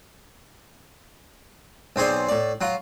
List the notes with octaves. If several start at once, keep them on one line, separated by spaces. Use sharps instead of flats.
B1 C4 G#4 C5 D5
A2 D5
F#3 F4